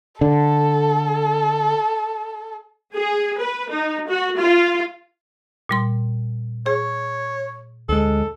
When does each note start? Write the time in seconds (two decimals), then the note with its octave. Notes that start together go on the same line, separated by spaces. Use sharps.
0.21 D3 A4
2.94 G#4
3.39 B4
3.70 D#4
4.08 F#4
4.40 F4
5.69 A#2 G3 C6
6.66 G#4 C#5
7.89 D2 G#3 A4